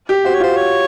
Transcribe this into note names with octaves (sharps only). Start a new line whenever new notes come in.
G4
F#4 C5
C#5
F4 C5
C#5